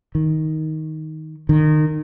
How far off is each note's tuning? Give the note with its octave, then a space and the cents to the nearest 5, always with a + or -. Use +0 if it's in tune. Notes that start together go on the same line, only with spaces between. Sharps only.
D#3 +10
D#3 -25